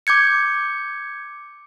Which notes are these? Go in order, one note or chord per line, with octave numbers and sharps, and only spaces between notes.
D6 G6 G#6 C#7